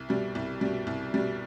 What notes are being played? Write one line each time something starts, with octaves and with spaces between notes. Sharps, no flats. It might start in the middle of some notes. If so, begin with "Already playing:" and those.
Already playing: C2
B2 G3
C2
B2 G3
C2
B2 G3